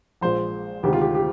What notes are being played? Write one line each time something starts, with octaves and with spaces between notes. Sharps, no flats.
A#1 A#2 G#3 C5
D2 C3 D#3 G#3 G4
F4
G4
G4